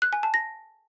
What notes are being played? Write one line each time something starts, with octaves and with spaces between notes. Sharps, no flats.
F#6
G#5
A5
A#6